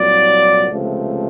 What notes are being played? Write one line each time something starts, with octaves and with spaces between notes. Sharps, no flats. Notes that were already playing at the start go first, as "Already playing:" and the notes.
Already playing: C2 A#2 F#3 D5
C#2 C3 F3 A3